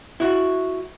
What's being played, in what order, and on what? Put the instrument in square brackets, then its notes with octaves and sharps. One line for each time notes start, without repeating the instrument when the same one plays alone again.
[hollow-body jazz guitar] E4 F#4